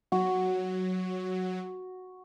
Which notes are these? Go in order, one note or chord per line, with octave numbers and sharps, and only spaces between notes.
F#3 F#4